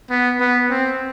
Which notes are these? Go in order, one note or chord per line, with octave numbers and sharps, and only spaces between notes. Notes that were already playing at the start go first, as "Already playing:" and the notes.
B3
B3
C4